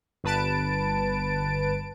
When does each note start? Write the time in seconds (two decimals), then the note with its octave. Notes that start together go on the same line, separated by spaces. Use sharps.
0.24 G1 B4 A5 D7